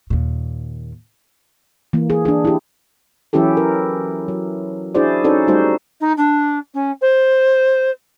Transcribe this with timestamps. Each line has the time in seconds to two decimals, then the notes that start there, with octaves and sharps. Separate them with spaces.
0.10 D#2 A#2
1.93 E3 A#3
2.10 G#4
2.25 D4 G#4
2.45 E4 G4
3.33 E3 F#3 C#4 E4 G4 A4
3.57 A#4
4.28 F#3
4.95 D4 E4 F#4 G#4 C5 D5
5.24 C#4 D#4 F#4 A4 C5 D5
5.48 G3 A3 D#4 F#4 C5
6.00 D#4
6.17 D4
6.74 C#4
7.01 C5